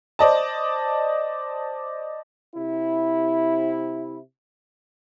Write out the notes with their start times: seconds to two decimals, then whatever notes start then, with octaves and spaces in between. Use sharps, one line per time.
0.19 C5 D5 D#5 A5
2.55 C3 E4